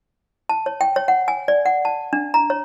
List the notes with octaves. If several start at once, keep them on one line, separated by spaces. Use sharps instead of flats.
A5
C#5
G5
C#5
F#5
G#5
D5
F#5
A5
D4
A#5
C#5